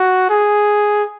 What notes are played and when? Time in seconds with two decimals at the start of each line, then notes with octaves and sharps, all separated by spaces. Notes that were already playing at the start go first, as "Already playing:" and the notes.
Already playing: F#4
0.30 G#4